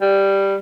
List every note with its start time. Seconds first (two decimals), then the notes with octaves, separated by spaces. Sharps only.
0.01 G3